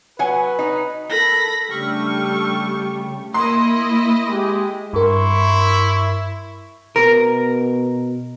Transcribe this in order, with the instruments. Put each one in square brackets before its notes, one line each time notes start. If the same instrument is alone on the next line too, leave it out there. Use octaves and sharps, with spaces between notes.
[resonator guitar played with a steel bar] F#3 F#5 G#5 [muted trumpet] B4
[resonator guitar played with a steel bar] D#4
[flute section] A4 A#4 [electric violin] B5 A#6
[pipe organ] C#3 G4 [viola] G3 A3 [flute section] D4 E6 F6 [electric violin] C#6
[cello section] A#3 [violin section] E4 D#5 [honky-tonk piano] C6
[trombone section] G#3 G4
[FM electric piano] G2 A#4 [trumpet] E4 [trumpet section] C6 C#6
[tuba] B2 [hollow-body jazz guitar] A#4